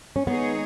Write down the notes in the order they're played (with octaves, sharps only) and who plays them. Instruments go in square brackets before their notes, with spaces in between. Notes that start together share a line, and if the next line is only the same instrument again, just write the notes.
[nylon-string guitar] C#4
[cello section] D#3 G#3 D#4 G#4 C#5 [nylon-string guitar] B3